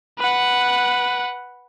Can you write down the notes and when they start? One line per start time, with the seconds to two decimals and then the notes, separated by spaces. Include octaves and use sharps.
0.19 B4 F#5